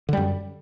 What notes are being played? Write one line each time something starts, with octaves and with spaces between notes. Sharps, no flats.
F#2 D3 G3